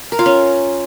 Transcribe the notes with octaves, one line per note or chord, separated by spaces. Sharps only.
A#4
F4
C#4